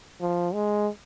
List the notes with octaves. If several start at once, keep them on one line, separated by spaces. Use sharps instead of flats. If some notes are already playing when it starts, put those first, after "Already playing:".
F3
G#3